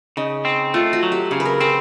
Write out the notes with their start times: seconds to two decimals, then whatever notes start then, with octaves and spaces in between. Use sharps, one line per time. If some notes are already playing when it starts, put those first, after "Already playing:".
0.17 C#3 D#4
0.45 C4
0.74 A3 F4
0.93 F#4
1.03 F#3
1.12 G4
1.31 C#3 G#4
1.40 B4
1.46 A#4
1.60 C4 B4